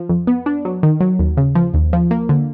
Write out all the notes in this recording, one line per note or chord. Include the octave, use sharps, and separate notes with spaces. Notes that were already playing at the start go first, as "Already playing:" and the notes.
Already playing: F3
F2
B3
D4
F#3
D#3
F#3
D#2
C#3
F3
D#2
F3
A#3
D3